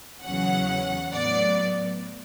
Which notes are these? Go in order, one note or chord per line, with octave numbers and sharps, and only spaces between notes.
E2 C#3 F#3 C#4 F#5
A2 F#3 B3 D5